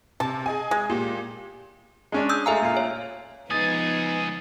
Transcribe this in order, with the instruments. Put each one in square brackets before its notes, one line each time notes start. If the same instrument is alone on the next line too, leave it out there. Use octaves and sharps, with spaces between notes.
[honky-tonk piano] C3 [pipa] A5
[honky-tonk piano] G#4 D#5 G#5
[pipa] G#3
[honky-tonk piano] A#2 G4
[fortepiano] G#3 C#4 D4
[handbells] D#6 E6 G6
[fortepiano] G#3 A3 F5 [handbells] E5 G#5 A#5
[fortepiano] A#2 F5
[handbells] C#5
[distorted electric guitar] C#2 G#4 [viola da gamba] F3 B3 B4 [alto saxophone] D#4 [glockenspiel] D#6 A6